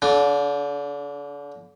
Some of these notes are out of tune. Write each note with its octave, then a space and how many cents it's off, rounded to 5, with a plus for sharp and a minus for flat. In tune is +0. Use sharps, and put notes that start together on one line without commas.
D3 -40 D4 +0